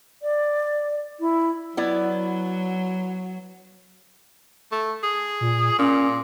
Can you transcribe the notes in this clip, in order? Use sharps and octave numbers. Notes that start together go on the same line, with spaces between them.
D5
E4
F#3 B3 E4 D5
A3
G#4
A#2
A#2 C#4